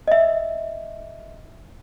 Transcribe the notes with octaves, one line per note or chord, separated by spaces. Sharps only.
D#5 E5